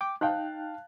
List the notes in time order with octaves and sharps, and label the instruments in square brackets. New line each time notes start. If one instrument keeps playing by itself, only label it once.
[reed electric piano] G5 D6
[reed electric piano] D#4 G5 [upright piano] F5 A5 F#6